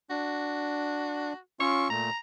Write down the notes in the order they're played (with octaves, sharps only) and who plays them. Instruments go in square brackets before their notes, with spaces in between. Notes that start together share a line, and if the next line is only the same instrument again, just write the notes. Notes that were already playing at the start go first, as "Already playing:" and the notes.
[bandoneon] D4 [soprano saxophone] F#4
[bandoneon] C#4 F4 E6 [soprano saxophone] C#6
[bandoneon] A#2 A3 [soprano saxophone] A#5